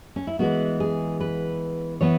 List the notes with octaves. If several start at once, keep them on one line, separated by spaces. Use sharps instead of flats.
C#4
E4
E3 G#3 B3 F#4
G#4
B4
E3 B3 C#5